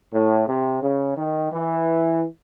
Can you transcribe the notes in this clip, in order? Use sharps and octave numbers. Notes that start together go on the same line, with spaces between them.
A2
C3
C#3
D#3
E3